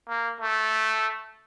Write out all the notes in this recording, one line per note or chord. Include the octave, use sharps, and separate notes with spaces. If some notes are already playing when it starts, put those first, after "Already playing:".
A#3
A3